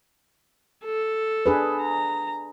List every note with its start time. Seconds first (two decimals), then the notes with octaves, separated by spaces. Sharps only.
0.85 A4
1.46 D4 G#4 B4
1.82 A#5